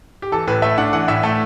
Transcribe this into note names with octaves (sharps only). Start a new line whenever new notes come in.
G4
E3 A4
A2 B4
A3 E5
D4 F#5
E3 F#5
A2 E5
A3